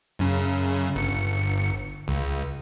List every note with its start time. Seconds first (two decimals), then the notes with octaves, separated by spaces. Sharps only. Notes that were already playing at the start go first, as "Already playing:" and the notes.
0.19 F#2 C#3
0.96 G1 C#7
2.08 C#2